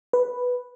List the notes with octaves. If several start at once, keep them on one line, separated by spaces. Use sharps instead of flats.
B4